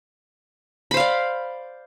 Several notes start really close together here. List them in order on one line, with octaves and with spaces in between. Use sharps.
B5 C5 F5 D5